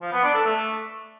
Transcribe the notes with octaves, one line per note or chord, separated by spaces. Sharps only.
F3
B3
D4
A4
A3